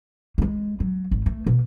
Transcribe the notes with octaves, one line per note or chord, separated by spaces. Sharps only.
G#3 A#3
F#3
G#1
A3
B2